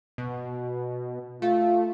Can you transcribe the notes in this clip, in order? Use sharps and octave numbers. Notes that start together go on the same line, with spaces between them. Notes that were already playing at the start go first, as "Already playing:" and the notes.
B2
A3 F4